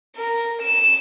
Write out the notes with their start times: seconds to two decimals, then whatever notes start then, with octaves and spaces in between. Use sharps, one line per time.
0.16 A#4
0.62 E7